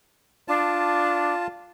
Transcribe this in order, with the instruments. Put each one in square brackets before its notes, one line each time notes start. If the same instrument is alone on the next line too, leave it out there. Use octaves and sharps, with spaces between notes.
[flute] D4 [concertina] F4 A5